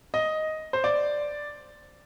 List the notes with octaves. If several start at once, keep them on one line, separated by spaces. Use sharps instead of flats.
D#5
C5
D5